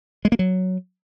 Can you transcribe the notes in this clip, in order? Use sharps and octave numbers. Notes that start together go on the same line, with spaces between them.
G#3
A#3
F#3